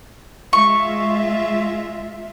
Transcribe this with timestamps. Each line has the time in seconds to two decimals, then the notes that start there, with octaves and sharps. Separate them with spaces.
0.53 G#3 F4 E5 C#6